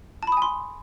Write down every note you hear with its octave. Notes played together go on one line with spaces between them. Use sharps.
G#5 A5 B5 C6 D#6